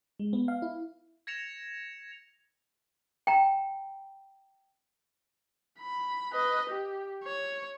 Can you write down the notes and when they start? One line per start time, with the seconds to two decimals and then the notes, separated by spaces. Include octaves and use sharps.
0.19 G#3
0.33 B3
0.48 F5
0.62 E4
1.27 G#6 A#6 C#7 E7 F7
3.27 G5 A#5
5.79 B5
6.33 B4 D#5
6.69 G4
7.24 C#5